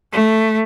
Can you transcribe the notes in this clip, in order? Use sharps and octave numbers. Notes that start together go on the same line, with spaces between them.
A3